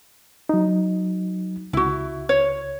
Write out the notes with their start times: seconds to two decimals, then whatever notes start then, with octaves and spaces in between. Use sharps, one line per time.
0.49 F#3 D#4
1.73 C#2 E4 F#4
2.29 C#5